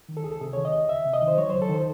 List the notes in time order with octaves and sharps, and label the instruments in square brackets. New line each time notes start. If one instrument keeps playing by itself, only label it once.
[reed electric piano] D#3
A4
C#2 G#4
A4
C3 G#4
D#3 C#5
D#5
C#2
C#2 E5
C3
D#5
D#3
C5
F#3 C#5
C#2 C5
A4
D#3 C5